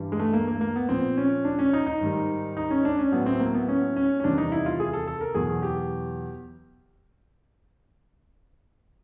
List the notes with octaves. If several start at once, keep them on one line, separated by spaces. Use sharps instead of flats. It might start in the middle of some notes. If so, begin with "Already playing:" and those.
Already playing: G2 E3 G3
G#3
A3
A#3
A#3
A#3
B3
A#2 F3 C4
C#4
D4
C#4
D#4
D#4
G#2 D#3 G3
D#4
C#4
D4
C#4
A2 F#3 B3
C4
A#3
B3
C#4
C#4
C#4
E2 C3 D#3 G3 D4
D#4
E4
F4
G#4
A4
A4
A#4
E2 B2 F#3 G#4
G4